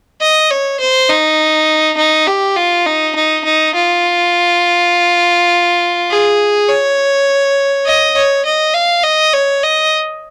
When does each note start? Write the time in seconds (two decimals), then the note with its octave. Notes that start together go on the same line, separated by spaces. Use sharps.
0.21 D#5
0.51 C#5
0.80 C5
1.09 D#4
1.97 D#4
2.27 G4
2.56 F4
2.86 D#4
3.15 D#4
3.45 D#4
3.75 F4
6.10 G#4
6.69 C#5
7.86 D#5
8.16 C#5
8.45 D#5
8.74 F5
9.03 D#5
9.33 C#5
9.63 D#5